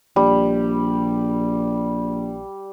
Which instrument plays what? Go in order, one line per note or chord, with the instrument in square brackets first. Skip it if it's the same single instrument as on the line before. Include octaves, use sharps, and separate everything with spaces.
[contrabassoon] A#1 [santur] G3